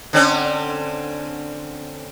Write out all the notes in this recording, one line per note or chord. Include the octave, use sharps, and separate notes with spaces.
D3 C4 C#4